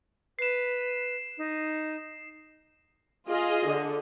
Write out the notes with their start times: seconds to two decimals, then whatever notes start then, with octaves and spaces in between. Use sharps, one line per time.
0.39 B4 C7 E7
1.38 D#4
3.29 F4 G#4 D#5
3.68 D3